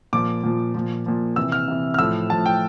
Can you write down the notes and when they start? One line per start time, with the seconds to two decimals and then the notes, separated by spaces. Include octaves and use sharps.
0.13 A#2 F3 D6
0.43 A#2 F3
0.74 A#2 F3
1.06 A#2 F3
1.36 C3 E3 E6
1.52 F6
1.68 C3 E3
1.94 F6
1.99 A2 F3 E6
2.30 A2 F3 A5
2.46 G5